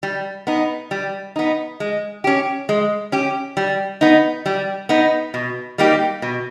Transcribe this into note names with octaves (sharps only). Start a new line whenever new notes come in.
G3
B3 D#4
G3
B3 D#4
G#3
C#4 G4
G#3
C#4 G4
G3
B3 D#4
G3
B3 D#4
B2
G3 A#3 D#4 G4
B2